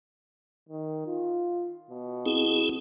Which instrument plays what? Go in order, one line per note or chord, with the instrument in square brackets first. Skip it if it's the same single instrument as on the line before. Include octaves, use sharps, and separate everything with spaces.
[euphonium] D#3
F4
B2
[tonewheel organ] C4 E4 G#4